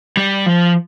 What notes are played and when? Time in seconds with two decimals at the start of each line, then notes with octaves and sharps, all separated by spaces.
0.17 G3
0.46 F3